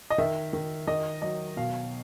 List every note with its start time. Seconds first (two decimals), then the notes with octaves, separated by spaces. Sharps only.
0.10 D#5
0.18 D#3 E5
0.53 D#3
0.87 D#3 D#5
1.22 F#3 D#5
1.57 B2 F5